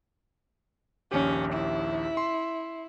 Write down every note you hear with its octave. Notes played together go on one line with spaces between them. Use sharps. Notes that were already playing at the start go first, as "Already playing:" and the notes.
A#1 D#2 C#4 G4
E4
C6